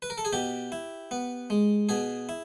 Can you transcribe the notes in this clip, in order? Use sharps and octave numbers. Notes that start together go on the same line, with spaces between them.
B4
A#4
A4
G#4
B2 G4
E4
B3
G#3
B2 G#4
E4